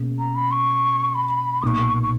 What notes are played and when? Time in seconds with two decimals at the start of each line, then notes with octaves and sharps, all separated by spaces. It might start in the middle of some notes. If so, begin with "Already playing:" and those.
Already playing: B2 A#3 C#4 G#4
0.19 A#5
0.35 B5
0.51 C#6
1.15 B5
1.62 B1 A#2 A#3 D#4 C#6 D#6
2.03 C#6